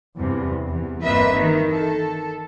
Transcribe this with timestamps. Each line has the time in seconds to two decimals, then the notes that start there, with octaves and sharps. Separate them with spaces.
0.17 E2 G2 C3
0.67 E2
1.02 G1 A#3 C4 B4 D#5 E5
1.33 D#3 E3
1.69 A4